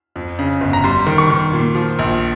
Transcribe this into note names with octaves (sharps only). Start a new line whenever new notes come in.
F2
C#3
G1
A#5
G3 C6
D#3
C#6
D#3
A#2
F3
A#1